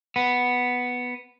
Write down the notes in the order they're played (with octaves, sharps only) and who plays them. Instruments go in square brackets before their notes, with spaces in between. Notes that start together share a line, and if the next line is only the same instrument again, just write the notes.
[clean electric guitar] B3